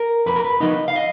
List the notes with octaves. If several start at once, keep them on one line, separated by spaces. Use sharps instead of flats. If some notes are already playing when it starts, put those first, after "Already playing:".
Already playing: A#4
F2 B4
A#4
B4
F3 B3 D#4 D#5
F5
D#5